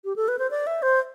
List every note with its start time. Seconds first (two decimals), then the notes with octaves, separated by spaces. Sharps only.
0.05 G4
0.16 A4
0.28 B4
0.39 C5
0.51 D5
0.67 E5
0.82 C5